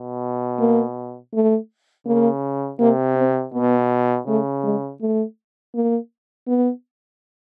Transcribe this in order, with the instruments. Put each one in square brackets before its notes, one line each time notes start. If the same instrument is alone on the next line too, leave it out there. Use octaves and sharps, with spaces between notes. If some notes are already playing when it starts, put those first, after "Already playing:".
Already playing: [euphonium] B2
[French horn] A#3
A3
[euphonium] C#3 [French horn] A#3
[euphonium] C3 [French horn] A#3
[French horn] C4
[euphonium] B2 [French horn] B3
[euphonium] C#3 [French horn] A3
[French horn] G#3
A3
A#3
B3